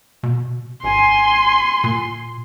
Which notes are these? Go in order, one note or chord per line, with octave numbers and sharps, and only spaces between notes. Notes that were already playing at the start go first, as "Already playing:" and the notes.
B2
G#1 G#5 C6
A#2